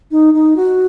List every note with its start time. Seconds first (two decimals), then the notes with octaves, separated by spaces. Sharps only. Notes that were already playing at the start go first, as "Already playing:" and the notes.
0.11 D#4
0.34 D#4
0.56 F#4